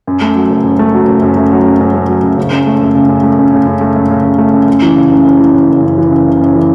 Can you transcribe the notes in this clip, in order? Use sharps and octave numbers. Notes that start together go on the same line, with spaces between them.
F#2
A3
F#3
F#1
F#2
A3
F#3
F#1
F#2
A3
F#3
F#1
F#2
A3
F#3
F#1
C#3
F#2
A3
F#2
C#3
F#2
A3
F#2
C#3
F#2
A3
F#2
C#3
F#2
A3
F#2
F#2
E3
C#3
F#1
F#2
E3
C#3
F#1
F#2
E3
C#3
F#1
F#2
E3